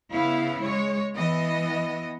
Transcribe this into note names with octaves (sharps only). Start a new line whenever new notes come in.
C#3 B3 E4 F5
G#3 C#5
E3 B3 D#5